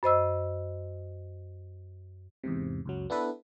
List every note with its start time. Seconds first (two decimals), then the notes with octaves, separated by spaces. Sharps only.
0.03 F#2 C5 D#5 E6
2.44 E2 G#2 C3
2.86 C#2 F#2 F#3
3.10 B3 D4 E4 A4 B4